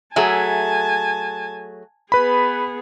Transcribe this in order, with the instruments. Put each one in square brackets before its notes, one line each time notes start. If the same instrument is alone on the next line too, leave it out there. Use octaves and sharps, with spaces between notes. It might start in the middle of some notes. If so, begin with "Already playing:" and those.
[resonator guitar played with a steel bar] F#3 A3 G#4 [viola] G#5 A5
[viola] B3 G#4 [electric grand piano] B4 B5